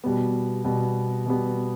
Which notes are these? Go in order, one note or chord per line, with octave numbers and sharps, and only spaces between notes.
B2 G3 B3
B2 G3 B3
B2 G3 B3